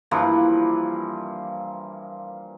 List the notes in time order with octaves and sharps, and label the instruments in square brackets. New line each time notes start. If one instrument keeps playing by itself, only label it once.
[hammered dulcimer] G2 E3 F3 A#3